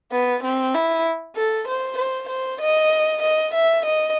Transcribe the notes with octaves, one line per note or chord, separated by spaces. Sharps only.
B3
C4
E4
A4
C5
C5
C5
D#5
D#5
E5
D#5